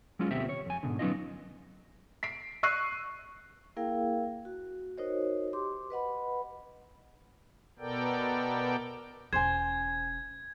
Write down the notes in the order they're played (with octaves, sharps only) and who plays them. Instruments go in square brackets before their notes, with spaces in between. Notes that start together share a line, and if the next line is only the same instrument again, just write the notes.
[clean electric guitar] F#3 G#3 C#4 F4
D2 B2 C4 G4 E5
C#5
F2 G#5
G#2 B2 D3
F#3 B3 C#4 D#4 F4 D#5
[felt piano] B6 C7 D7
C#6 E6 F#6 C7 D#7
[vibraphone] A#3 E4 G#4 A#4 F5 G5
F#4
D#4 F#4 A#4 C5 C#5 D#5
G4 C6 D6
B4 D#5 F#5 B5
[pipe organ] B2 B3 A4 A#4 D5 G5
[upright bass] E1 C#4 [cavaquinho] C5 G#5 [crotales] G#6